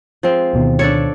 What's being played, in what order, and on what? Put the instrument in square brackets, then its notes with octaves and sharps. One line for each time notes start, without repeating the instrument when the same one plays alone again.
[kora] F3 G#3 C4
[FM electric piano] D2 B2 D#3
[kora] D4 A4 C#5